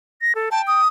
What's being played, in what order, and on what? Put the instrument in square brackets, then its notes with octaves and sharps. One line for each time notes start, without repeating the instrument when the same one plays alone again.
[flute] A#6
A4
[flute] G5 [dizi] A5
[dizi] D#6